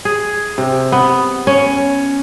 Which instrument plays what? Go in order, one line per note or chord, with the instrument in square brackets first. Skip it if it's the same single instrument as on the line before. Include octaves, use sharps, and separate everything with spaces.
[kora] G#4
C3
B3
C#4